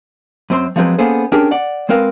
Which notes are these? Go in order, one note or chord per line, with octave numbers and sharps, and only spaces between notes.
F#2 C4 C6
F3 F#3 G#3 C4 B4
A#3 B3 C#4 G#4 A4 C5
C#4 D4 G4 G#4 A#4
D5 F#5
G#3 C4 A#4 B4 F5